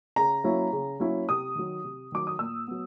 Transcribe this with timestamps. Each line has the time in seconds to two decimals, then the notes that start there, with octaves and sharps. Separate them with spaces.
0.16 C#3 A#5
0.44 F#3 A#3 C#4 E4
0.72 C#3
1.00 F#3 A#3 C#4 E4
1.29 C3 D#6
1.55 D#3 F#3
1.84 C3
2.12 D#3 F#3 D6
2.27 D#6
2.39 A#2 E6
2.67 F#3 B3